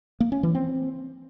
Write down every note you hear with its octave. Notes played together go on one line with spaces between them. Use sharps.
A#3
C#4
E3
C4